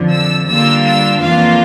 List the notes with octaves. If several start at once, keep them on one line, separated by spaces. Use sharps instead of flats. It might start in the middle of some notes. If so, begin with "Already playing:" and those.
Already playing: F2 D3 F3
E6
D3 G3 A#3 D4 F4 E6
E6
F2 E3 A#3 D4 F4 F5